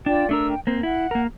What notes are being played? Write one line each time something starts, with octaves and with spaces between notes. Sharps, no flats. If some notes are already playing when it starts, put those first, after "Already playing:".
D4 F4 D5 G5
A3 D4 A#4 E6
G5
A#3 C4 C5
E4 F#5
A#3 A#4